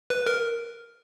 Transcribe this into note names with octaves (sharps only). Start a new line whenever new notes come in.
B4
A#4